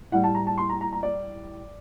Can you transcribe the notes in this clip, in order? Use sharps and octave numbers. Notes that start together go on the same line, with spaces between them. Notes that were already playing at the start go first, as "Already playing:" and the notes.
A2 G3 F#5
A5
A#5
A5
C6
A#5
A#5
A#5
D5